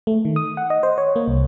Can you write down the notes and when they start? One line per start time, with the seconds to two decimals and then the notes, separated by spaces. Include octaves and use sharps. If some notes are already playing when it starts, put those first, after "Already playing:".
0.07 A3
0.25 D#3
0.36 D#6
0.57 F#5
0.70 D#5
0.83 C5
0.98 C#5
1.16 A#3
1.28 C2